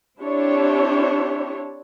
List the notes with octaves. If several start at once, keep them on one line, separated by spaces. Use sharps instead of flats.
C4 D4 E4 G4 C#5